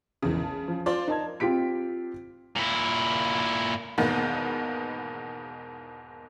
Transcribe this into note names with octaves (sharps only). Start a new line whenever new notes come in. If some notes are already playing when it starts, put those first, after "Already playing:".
E1 A#1 E2 C#3
A5
F3
F4 C5 D5
D#4 A#4 A5 G#6
C4 F4 G4 B6 D7
A#2 E4
E2 G#2 B2 D#3 A#3 B3